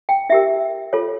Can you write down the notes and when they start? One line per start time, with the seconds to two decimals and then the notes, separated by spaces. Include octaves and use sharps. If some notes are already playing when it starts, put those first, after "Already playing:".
0.09 G5
0.30 E4 G4 A#4 E5
0.93 F4 A4 C#5